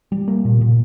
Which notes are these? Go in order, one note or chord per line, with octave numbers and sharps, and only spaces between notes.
G3
A#3
A#2
A#2